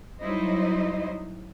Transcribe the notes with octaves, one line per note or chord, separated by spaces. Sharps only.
F#3 G3 D#4 E4 C5 D#5